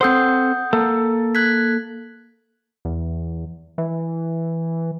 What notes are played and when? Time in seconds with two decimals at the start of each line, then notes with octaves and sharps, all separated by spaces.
0.01 C4 A4 C5 F#5 D#6 G6
0.73 A#3 A4
1.35 F#6 G#6 B6
2.85 E2
3.78 E3